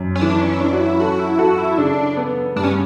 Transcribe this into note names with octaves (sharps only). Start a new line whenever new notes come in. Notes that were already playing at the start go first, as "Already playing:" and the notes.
Already playing: F#2
C#4
E3 D4
C#4
E4
C#4 D4
F#4
E4
F#4 A4
E4
F#4 A4
E4
C#3 D4
B3
G2 D4
C#4